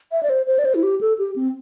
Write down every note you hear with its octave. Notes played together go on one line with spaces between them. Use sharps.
E5
D5
C5
C5
D5
C5
E4
G4
A4
G4
C4